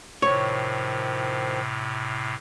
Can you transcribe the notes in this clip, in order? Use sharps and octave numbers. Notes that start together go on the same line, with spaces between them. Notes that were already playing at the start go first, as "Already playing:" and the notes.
A2 C3 D#3 F3 C#5